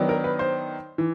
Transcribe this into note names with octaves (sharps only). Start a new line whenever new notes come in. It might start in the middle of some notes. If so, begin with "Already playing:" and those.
Already playing: D#3 F#3 B3 D4
A#4
B4
C5
E3